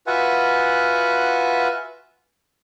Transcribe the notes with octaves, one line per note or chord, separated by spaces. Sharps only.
F4 F#4 B4 E5 F#5 G#5